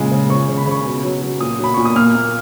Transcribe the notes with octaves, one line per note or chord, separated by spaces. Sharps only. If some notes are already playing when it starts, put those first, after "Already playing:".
Already playing: A#2 C#3 G#3
C#3
C#3 C#6
C#3
B5
C#3 C#6
B2
F#3
F#3
A#2 D#6
F#3 B5
A#2 C#6
D#6
A#3 F6
A#3